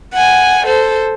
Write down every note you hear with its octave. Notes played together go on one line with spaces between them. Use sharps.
F#5 G#5
A4 C5